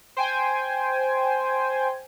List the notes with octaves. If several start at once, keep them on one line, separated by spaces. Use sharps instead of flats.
C5 G5 G#5